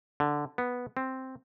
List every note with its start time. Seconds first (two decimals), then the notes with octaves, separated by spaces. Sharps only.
0.20 D3
0.58 B3
0.97 C4